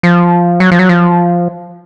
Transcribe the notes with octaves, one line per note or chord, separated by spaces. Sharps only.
F3
F#3
F3
F#3
F3